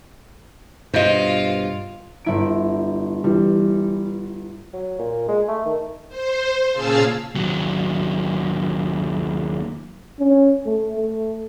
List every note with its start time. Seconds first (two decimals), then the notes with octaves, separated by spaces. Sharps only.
0.94 G2 B2 F4 C5 D#5
2.25 G1 E4 D7
3.24 E3 G3
4.73 F#3
4.99 A#2
5.28 G#3
5.48 A3
5.65 D#3
6.08 C5
6.72 A#2 C#3 G#4 F5 A5 E6
7.35 D#2 F#3
10.19 C#4
10.66 A3
10.96 A3